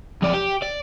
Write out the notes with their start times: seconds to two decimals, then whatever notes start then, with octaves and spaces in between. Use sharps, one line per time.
0.23 F2 D5
0.34 G4
0.63 D5